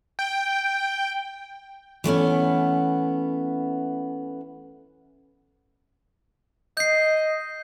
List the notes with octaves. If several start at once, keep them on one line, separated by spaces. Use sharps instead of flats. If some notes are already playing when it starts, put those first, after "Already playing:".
G5
E3 A3 B3 C#4
D#5 G6 C7